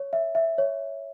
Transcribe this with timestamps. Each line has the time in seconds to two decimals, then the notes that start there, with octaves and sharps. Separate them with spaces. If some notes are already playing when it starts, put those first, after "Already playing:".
Already playing: C#5
0.13 E5
0.35 E5
0.58 C#5